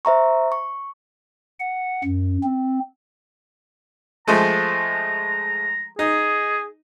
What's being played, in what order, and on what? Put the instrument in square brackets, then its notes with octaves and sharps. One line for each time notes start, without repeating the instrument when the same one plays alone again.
[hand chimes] C5 E5 A#5 C#6
C#6
[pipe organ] F#5
F#2
C4
[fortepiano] F3 G#3 A3 [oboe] A#5
[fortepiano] D#4 [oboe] G#4